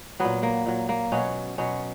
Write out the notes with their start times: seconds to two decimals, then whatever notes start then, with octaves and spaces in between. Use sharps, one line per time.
0.20 A#2 F#3 B3
0.43 A#3
0.66 A#2 F#3
0.89 A#3
1.12 B2 F#3 C#4
1.58 B2 F#3 C#4